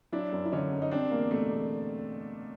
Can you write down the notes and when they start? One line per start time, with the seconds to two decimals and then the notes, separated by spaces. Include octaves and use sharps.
0.12 F#3 D4 E4
0.33 F#2
0.45 E4
0.52 D3 C#4 D#4
0.72 F#2
0.82 D#4
0.91 G3 C4 D4
1.11 E2 A#3
1.31 B2 A3
1.51 E2